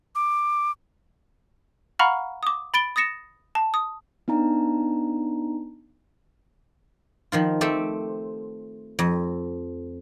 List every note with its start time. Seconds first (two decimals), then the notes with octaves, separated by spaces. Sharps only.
0.15 D6
1.99 F5 F#5 A#5 B5 C#6 F6
2.43 D6 D#6
2.74 B5 A6 D7 G7
2.96 D#6 A6 A#6 C#7 E7
3.55 A5
3.74 D#6
4.28 B3 D4 D#4 A#5
7.32 D#3 F3 F4
7.61 A3 C4 G4 A4
8.99 F2